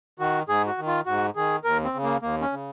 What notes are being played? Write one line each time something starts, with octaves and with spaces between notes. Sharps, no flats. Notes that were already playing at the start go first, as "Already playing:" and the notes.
D#3 F#4
G#2 G#4
F#4
D#3
F4
G#2 F#4
D#3 G#4
D#2 A#4
C4
C#3
A#3
D#2 A#3
C#4
C#3